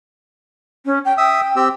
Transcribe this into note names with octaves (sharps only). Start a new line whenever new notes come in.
C#4
G5
E5 G5 D#6 E6
C4 G4 E6